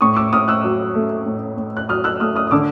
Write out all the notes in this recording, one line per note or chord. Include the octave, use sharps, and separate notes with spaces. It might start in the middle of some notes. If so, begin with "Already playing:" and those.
A2 C#6 D#6
D6 E6
A2 D#6 F6
E6 F#6
F#3
A3
A2
A2
F#6
F#3 D#6 F6
E6 F#6
A3 D#6 F6
D#6 F6
D#6
D3 D6 E6